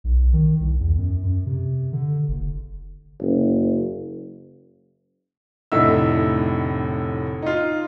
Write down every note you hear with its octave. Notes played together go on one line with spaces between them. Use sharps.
B1
D#3
C2
E2
F#2
F#2
C3
D3
F#1
F#1
F1 A2 D3 D#4 E5 E6
D#4 F4